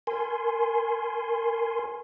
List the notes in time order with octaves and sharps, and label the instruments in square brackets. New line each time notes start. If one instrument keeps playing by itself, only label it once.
[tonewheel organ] A#4 G#5 C6